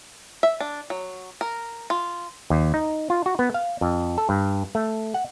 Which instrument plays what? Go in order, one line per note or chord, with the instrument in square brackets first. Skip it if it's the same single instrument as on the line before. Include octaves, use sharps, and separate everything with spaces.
[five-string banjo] E5
D4
F#3
A#4
F4
[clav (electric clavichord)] D#2
D#4
F4
F#4
B3
F5
F2
A4
G2
A3
F#5